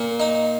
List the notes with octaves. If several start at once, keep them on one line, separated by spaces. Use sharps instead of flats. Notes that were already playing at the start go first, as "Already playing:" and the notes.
Already playing: A#2
D#4